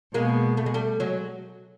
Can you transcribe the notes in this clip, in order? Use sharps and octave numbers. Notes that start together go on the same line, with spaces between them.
B2 G#3 A#3
A3
G#3
G3 A3
F#3 G#3